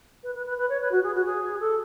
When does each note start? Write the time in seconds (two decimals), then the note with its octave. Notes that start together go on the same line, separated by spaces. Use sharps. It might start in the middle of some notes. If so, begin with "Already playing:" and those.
0.23 B4
0.35 B4
0.46 B4
0.58 B4
0.69 C#5
0.81 B4
0.92 F#4
1.03 G#4
1.14 F#4
1.25 G#4
1.60 A4